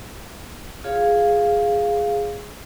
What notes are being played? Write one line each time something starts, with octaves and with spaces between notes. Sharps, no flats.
F4 G#4 C#5 F5